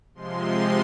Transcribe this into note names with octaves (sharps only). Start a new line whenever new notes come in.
C3 F3 G#3 C6